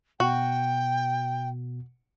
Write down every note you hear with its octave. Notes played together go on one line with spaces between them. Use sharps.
B2 F#4 G5